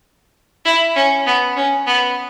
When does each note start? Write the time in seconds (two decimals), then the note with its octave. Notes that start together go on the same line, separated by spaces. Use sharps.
0.65 E4
0.95 C#4
1.26 B3
1.56 C#4
1.87 B3